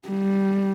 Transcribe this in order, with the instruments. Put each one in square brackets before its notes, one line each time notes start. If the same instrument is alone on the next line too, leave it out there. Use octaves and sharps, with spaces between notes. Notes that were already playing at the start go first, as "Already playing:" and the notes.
[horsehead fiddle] G3